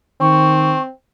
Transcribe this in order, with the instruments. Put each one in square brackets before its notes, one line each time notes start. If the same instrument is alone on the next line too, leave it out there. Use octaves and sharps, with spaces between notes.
[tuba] D#3 [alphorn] C4 [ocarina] C#6